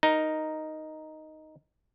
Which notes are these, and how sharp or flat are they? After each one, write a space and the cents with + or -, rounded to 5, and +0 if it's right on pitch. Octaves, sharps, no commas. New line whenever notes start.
D#4 +0 A#4 +0